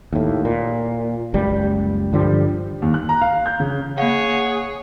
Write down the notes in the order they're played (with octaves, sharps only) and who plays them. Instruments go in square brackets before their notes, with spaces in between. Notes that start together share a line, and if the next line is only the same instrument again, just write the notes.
[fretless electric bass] D#2 A2
A#2
F#1 C#2 G3
G2 D3 F3 G3
[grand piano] D#2
F#6
A#5
F5
G6
C#3
[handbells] A#3 F5 [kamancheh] G#4 [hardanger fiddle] C#5 [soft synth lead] F#5